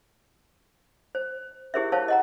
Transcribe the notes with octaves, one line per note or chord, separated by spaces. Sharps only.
C5
E4 G4 G#4 A#4 C5 E5
A#4 C5 C#5 F5 A5
D#5 F#5 A#5